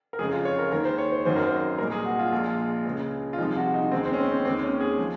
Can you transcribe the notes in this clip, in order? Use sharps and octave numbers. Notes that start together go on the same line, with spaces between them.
A#4
F#1 F2 C#3 G#3 G#4
F4
C#5
A#4
D#2 D#3 G#3 A#4
C5
C#5
C5
G#1 F#2 D#3 F#3 C5
A#4
C5
C2 A#2 G#3 A#4
G#4
F#4
F4
A#1 A#2 G#3
C#2 C#3 G#3
F4
C2 C3 F3 G#3 D#4
F#4
D#4
D#2 D#3 G#3 C4
C4
C#4
C4
C4
D#2 D#3 G#3 C4
C#4
G#4
F3 G#3